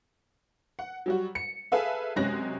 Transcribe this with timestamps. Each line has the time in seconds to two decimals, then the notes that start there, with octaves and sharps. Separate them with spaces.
0.79 F#5
1.06 F#3 G3 F#4
1.35 C#7
1.72 G#4 A4 B4 E5 F5
2.16 F#2 C3 G#3 C#4 F#6 A#6